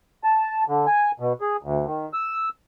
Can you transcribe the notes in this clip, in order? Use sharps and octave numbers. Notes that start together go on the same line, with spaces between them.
A5
D3
G#5
B2
G#4
D2
D#3
E6